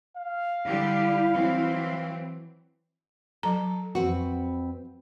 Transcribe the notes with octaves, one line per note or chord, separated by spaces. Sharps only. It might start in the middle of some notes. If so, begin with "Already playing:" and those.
F5
D3 G3 E4 G4
E3 F#3 C4
F#3 A4 A#5
F2 C4 F#4 B4